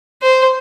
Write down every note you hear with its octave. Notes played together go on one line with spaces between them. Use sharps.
C5